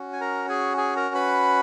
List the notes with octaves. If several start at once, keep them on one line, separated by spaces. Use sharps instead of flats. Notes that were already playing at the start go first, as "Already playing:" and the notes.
Already playing: C#4 F#4
G#5
A#4 A#5
G#4 G#5
G#4 G#5
A#4 A#5
B4 B5